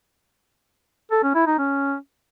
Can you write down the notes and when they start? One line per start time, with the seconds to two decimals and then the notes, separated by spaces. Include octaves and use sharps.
1.11 A4
1.23 C#4
1.35 E4
1.47 D#4
1.58 C#4